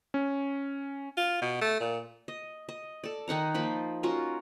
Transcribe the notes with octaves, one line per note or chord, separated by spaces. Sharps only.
C#4
F4
B2
A3
A#2
D#5
D#5
A4 D5
D#3 D#4 F#5 A#5
F3 A#3 F4 B5
C#4 F4 F#4 A#4